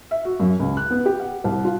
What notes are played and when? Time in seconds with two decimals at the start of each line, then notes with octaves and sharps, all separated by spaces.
0.11 E5
0.25 F#4
0.40 F#2
0.59 C#2
0.77 F#6
0.90 B3
1.06 G4
1.20 F#5
1.44 C2
1.65 F4